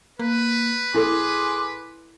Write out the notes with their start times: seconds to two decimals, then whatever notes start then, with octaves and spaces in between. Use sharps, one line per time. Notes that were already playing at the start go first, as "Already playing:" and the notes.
0.19 A#3 B4
0.94 A#1 E4 G#4 A4 C6 D6